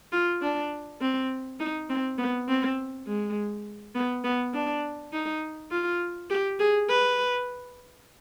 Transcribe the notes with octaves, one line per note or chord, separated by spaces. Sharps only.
F4
D4
C4
D#4
C4
B3
C4
G#3
B3
B3
D4
D#4
F4
G4
G#4
B4